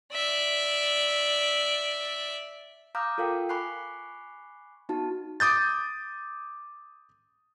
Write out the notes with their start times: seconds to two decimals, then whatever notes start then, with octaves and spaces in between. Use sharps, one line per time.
0.13 D5 E5
2.95 F5 A#5 D6 D#6 F6 G6
3.18 F4 A4 A#4 F5 G5
3.49 G#5 B5 C#6 D6 F#6 C7
4.89 B3 D#4 F#4 A5
5.40 D6 D#6 G6 A6